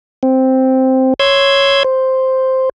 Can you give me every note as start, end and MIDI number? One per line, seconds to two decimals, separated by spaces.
0.23 1.14 60
1.20 1.83 73
1.20 1.83 84
1.20 1.83 88
1.20 1.83 92
1.84 2.69 72